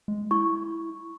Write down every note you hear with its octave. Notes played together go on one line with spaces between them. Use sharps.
G#3
E4 C#6